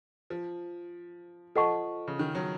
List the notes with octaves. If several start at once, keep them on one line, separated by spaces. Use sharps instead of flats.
F3
F3 A4 D#5 F#5 A5 C#6
C#3
D#3
F#3